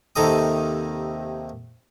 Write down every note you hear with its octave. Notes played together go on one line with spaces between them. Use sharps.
D#2 C3 D#3 A4 A#5 D#6